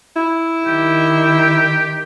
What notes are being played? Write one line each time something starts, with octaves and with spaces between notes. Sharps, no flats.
E4
D#3 G4